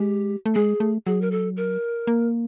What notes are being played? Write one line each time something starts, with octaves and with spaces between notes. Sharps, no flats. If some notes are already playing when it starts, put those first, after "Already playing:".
Already playing: G#3 G4
A3
G#3 G#4
A3
F#3 G#4
A#4
A4
A#4
A#3